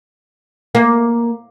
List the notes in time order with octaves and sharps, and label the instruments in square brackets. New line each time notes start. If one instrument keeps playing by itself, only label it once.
[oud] A#3